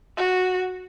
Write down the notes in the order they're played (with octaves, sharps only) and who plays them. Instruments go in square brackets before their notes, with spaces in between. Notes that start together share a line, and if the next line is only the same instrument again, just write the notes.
[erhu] F#4